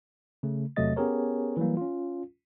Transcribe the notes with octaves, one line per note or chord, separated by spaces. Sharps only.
C#3 A3
E2 C3 F#3 A3 D#5 A6
B3 C#4 G4 G#4 A#4 C#5
E3 F#3 G3 A#3
C#4 F4